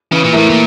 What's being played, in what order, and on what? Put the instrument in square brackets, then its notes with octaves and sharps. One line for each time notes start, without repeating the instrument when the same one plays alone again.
[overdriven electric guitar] C#3 [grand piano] E3
[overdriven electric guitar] A#2
[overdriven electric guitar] A2 [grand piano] A3 E4 A#4
[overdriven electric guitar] A#2